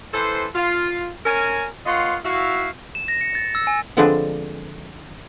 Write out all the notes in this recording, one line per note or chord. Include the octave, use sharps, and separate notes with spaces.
E3 A4 C5
F4
C#4 A#4 G#5
A#3 F4 C#5 D#5 F#5 C6
E4 F#4 F5
E7
A#6
C#7
A6
E6
G#5
D3 F3 G#3 C4 D4 B4